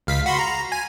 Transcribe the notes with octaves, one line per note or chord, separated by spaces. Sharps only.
C#2 F5 B6
F#4 B5 C6
A#5
G#5